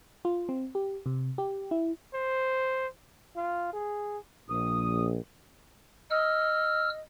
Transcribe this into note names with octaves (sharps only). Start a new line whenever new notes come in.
F4
C4
G4
C3
G4
E4
C5
F4
G#4
A#1 D#6
D#5 E6 F6